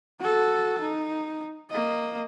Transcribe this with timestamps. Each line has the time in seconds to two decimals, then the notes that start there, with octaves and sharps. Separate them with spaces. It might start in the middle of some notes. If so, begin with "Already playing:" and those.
0.20 F#4 A4
0.81 D#4
1.70 A#3 D#5